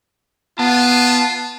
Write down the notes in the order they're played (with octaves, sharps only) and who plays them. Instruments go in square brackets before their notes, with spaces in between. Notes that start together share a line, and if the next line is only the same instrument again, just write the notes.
[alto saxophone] B3 [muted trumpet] F4 [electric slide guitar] A5